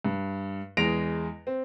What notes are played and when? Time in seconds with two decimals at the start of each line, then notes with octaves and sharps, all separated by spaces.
0.05 G2
0.77 E2 G#3 D#5 A#6 D7 F7
1.47 C4